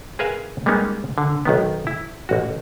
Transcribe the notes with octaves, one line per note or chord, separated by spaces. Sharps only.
G#4 A#4 B4 E5 F5 G#5
G3 G#3 A#3 B3 C#4 D#4
D3
B1 D#3 B3
E4
A1 F#4